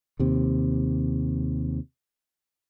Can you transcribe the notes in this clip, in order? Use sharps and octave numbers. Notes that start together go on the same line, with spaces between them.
D#2 C3